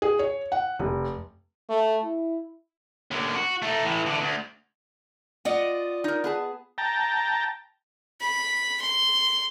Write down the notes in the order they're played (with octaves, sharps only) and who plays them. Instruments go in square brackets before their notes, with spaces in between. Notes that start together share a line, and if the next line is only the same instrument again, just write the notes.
[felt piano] G#4
C#5
F#5
F1
[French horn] A3
E4
[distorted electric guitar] D#2 D3
F#4
A3 D#4
A2 E3
D3 E3
D2
[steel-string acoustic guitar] F4 D5 D#5 [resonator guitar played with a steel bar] F#5
[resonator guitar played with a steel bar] D#4 A#4
B3 G#4 A5
[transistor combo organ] G5 A5 A#5
[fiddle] B5
C6